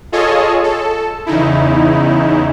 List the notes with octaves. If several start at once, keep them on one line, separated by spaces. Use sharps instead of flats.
F4 G#4 A4 C#5 D#5
A4
E2 C#3 D#4 E4